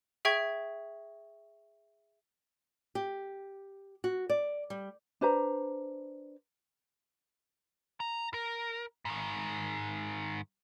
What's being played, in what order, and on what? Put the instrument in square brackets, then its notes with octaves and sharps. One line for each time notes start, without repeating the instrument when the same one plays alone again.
[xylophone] G#4 E5 G5 C#6 G#6
[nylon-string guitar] G4
F#4
D5
G3
[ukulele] D4 B4 C5 A#5
[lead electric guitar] A#5
A#4
G#2 D#3